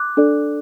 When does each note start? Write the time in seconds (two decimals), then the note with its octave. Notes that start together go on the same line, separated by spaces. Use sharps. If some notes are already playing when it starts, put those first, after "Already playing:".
Already playing: D6 F#6
0.17 D4 A4 D5